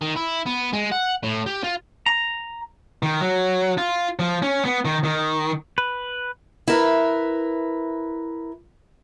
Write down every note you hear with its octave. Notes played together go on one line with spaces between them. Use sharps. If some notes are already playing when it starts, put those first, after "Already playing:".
D#3
E4
B3
G#3
F#5
A2
G4
F4
A#5
D#3
F#3
F4
F3
C#4
B3
D#3
D#3
B4
E4 A#4 B4